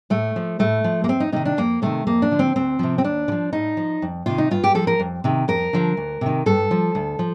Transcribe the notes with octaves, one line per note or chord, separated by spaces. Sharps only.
A2 A3
F3
A2 A3
F3
A#3
F2 C4
D#4
C3 D#3 D#4
D4
F2 A#3
C3 D#3 A3
F2 A#3
D4
D3 F3
C4
D2 C4
C3 F3
C4
D#2 D4
D3
F3
A2 D#4
F3
F2
C3 D#3 F4
D#4
G2 F4
G4
F3 A4
A#4
F2
C3 D#3
F2 A#4
D3 F3
D2
C3 D#3
G2 A4
F3
D2
F3